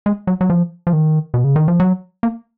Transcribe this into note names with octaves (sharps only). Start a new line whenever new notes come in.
G#3
F#3
F#3
F3
F3
D#3
B2
C#3
D#3
F3
F#3
A#3